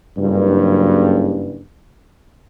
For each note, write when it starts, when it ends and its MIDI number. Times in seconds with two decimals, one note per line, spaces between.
0.16 1.59 30
0.16 1.59 43